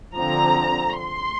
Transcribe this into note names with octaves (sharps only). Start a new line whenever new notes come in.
D3 F3 C4 A#5
C6